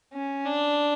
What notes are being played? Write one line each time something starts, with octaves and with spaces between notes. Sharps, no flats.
C#4
D4